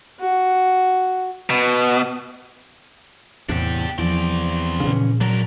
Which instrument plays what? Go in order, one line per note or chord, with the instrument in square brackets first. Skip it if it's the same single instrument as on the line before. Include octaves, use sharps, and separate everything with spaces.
[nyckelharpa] F#4
[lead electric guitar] B2
[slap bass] E2 A2 C3 [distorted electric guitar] D4 G4
[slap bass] E2 [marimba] F3 [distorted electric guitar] C4 D5
[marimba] A#2 [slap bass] C#3 E3 C#4
[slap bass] F#3 [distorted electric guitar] D4 A#4